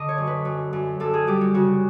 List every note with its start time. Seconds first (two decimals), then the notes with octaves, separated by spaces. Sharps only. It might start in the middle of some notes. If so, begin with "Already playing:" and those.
Already playing: D3 D#5
0.08 C#5
0.18 F#2
0.27 B4
0.45 F#2
0.73 F#2
1.00 F#2 A4
1.13 G#4
1.27 G3 G4
1.41 F#4
1.54 C#3 F#4